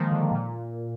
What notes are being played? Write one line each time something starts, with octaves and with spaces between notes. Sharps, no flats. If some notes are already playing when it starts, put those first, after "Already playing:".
Already playing: D#3 F3 G#3 A#3
D3
A#2